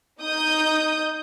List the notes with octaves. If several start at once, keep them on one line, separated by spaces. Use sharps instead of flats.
D#4 D#6 G6